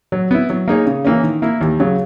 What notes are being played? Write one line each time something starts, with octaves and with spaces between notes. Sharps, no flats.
F#3
B3 E4
F#3
A#3 D#4 G#4 C#5
C#3
E3 A#3 C#4
D#3
A#3 E4
D#2
C#3 F#3